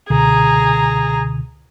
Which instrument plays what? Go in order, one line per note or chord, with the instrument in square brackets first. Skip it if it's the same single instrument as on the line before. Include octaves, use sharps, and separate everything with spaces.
[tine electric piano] C#2 B2 D3 [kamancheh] G#4 A#5